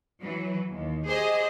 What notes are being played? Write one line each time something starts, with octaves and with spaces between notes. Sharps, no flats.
E3 F#3
D#2
G4 G#4 C5 D#5